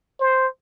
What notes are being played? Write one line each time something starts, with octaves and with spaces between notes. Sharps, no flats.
C5